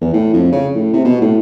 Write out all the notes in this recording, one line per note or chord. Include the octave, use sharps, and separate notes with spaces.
E2
A2
F2
C#3
A2
C3
B2
A2